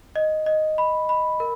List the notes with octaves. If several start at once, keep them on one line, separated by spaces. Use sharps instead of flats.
D#5
D#5
B5
B5
A#4